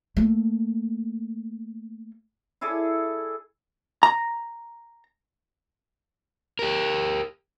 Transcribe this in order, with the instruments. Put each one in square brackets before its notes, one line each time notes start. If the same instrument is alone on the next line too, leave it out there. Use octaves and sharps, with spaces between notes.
[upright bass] A3 A#3
[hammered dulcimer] E4 G#4 A4 D5
[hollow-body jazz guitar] A#5
[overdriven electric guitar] G4 A#4